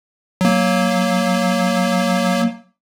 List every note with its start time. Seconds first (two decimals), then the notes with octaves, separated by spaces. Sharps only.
0.41 F#3 A#3